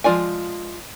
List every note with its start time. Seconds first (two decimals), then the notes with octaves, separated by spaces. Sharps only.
0.04 F3 G#3 F4 D5 G#5